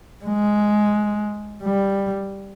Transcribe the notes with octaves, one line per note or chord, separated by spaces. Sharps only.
G#3
G3